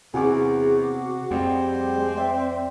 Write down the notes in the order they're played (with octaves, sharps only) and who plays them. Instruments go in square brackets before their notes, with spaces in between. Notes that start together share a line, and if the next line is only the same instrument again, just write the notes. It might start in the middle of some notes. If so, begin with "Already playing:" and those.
[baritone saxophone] E2 [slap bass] C3 [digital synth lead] F#4 [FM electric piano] G#4 F#5 D6
[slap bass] F2 [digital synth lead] G3 [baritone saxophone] C4
[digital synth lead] G#3
[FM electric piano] D5 G5 [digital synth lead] E5